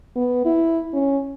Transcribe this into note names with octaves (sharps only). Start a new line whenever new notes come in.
B3
E4
C#4